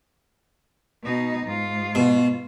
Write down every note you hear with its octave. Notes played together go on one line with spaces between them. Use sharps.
B2 D#4
G#2 F4
B2